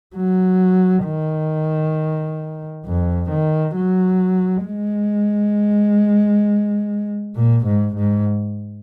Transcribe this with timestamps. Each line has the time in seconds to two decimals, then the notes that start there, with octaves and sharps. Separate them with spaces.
0.16 F#3
1.05 D#3
2.86 F2
3.31 D#3
3.76 F#3
4.66 G#3
7.36 A#2
7.66 G#2
7.96 G#2